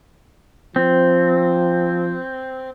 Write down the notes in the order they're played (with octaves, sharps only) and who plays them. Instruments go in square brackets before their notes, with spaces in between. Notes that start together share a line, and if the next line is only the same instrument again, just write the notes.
[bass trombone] F3 [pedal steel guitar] C4